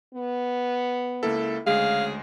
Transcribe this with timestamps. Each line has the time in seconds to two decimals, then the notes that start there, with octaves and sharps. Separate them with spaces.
0.14 B3
1.23 C#2 A#3 E4 A4
1.66 D2 C#3 G#3 G#4 F5